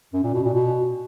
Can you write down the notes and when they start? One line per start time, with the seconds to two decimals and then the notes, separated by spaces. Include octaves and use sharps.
0.14 F#2
0.24 A#2
0.34 B2
0.44 A#2
0.54 B2